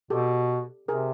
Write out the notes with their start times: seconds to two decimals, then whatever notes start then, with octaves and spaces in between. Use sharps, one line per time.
0.10 B2 G4 A4
0.88 C3 G#4 A#4